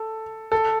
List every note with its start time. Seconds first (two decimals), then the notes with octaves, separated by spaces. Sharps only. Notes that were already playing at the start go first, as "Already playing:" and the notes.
Already playing: A4
0.52 A4